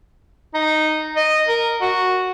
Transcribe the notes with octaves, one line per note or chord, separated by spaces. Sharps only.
D#4
D#5
A#4
F#4